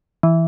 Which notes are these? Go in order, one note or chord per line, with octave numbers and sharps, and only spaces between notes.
E3